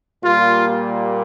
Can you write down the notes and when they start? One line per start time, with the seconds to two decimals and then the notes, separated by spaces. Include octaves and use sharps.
0.24 A#2 G3 A#3 F4